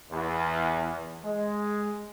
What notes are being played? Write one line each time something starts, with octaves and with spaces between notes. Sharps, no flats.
E2
G#3